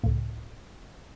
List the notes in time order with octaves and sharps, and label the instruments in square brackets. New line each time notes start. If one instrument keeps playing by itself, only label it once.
[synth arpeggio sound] C#2 A2